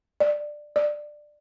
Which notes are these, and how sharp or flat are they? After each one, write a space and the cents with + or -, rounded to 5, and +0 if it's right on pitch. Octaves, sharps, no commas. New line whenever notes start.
D5 +10
D5 +15